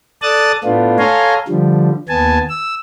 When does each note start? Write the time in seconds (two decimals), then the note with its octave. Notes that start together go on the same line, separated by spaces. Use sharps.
0.22 A4 D5 A5 D#6 F#6 A6
0.64 A2 A3 B3 D4 F4
0.99 A4 C#5 F5 G#5 A#5 C6
1.48 D3 F3 G3
2.09 D#2 B3 G#5 A5
2.49 E6